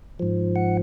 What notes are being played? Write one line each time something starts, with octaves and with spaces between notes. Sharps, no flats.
G#2 F3
F#5